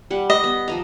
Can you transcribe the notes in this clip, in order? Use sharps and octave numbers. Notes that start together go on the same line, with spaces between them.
G3 F#5
D#5
B3
F3 D#5 A#5